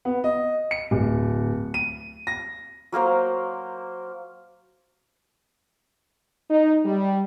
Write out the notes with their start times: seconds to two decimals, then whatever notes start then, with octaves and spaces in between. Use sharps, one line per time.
0.05 B3
0.24 D#5
0.71 C#7
0.91 D1
1.74 D#7
2.27 A#6
2.92 F#3 A#3 A#4 C5
6.50 D#4
6.85 G3